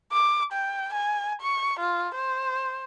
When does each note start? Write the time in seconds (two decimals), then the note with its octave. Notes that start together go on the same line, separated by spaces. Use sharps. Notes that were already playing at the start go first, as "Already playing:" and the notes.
0.12 D6
0.53 G5
0.94 G#5
1.41 C#6
1.79 F4
2.15 C5